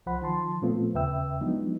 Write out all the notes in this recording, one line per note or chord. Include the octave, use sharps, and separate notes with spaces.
C2 F3 C5 F#5 B5
D#3 F3 A5 C6
A#2 F3 A3 B3 C4 F4
D#2 C#3 B4 E5 G5 E6
F3 F#3 G#3 B3 D4 D#4